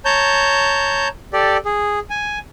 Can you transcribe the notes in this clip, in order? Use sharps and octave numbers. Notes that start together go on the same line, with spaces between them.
C#5 A5 A#5 G6
G4 A4 D5
G#4
G#5